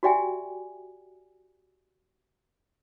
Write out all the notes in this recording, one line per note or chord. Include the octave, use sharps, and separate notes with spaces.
F#4 G4 D5 E5 G5 G#5